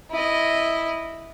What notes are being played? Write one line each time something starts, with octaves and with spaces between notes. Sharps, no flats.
E4 D#5